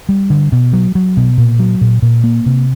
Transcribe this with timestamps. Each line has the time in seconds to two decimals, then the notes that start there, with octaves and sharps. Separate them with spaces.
0.09 G3
0.30 D3
0.52 B2
0.73 F#3
0.95 F#3
1.17 B2
1.38 A#2
1.59 F#3
1.81 A#2
2.02 A#2
2.24 A#3
2.46 C3